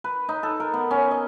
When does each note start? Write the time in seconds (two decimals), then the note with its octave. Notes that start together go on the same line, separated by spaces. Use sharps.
0.04 B4
0.29 D#4
0.43 A4
0.60 A#4
0.74 B3
0.91 C#4
1.11 D#5